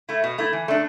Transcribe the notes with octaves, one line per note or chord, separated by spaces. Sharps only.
A3 E4
B2
A3 E4
E3
A3 D4